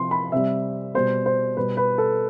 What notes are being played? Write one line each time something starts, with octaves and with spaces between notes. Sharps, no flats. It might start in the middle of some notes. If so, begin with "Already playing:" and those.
Already playing: C3 F3 C6
B5
C3 G3 E5
B2 G3 C5
C5
B2 G3 B4
B4
A4